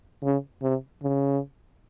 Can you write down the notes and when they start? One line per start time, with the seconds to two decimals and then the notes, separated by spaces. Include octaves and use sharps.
0.23 C#3
0.62 C3
1.02 C#3